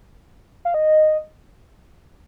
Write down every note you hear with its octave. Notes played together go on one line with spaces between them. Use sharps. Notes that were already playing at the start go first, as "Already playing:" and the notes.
F5
D#5